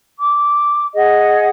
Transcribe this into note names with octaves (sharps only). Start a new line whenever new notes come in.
D6
G#4 D#5 F#5